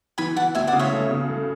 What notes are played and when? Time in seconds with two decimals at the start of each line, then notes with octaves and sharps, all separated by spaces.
0.18 E3 G#5 B5
0.36 E3 F#5 A5
0.55 D2 E5 G#5
0.67 D5 F#5
0.73 C#3
0.79 C#5 E5
0.93 A3
1.11 C#3
1.29 A3